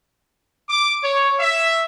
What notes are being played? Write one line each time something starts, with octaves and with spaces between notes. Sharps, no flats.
D6
C#5
E5